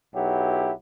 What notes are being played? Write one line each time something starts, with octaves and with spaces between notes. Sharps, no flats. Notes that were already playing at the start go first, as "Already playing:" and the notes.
B1 F#3 E4 G4